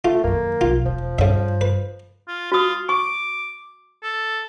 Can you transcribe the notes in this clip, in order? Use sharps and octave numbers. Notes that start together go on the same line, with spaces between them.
A3 F4
F#2 D#3 A#3
B1 F3 F4
E1 F3
G2 C#3 E5
B4
F4
F4 F#4 D#6
C#6 D6
A4